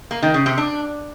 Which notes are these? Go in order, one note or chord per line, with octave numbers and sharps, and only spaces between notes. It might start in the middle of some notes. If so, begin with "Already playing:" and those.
A#3
D#3
C#3
C3
D4